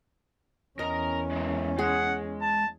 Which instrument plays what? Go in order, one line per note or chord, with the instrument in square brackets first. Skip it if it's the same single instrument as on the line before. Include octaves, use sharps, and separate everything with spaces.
[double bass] E2 C#4 [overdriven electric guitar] A#4 A#5 [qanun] D#5
[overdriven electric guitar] G#3 A#3
[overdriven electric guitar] G#3 [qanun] G#4 [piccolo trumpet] F#5
[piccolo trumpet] A5